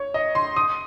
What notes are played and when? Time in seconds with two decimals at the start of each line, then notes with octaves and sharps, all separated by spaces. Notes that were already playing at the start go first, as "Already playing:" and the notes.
Already playing: C#5
0.14 D#5
0.35 C6
0.57 D#6